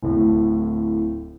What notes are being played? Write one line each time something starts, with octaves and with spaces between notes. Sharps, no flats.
D1 A2